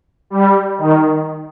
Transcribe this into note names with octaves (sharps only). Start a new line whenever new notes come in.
G3
D#3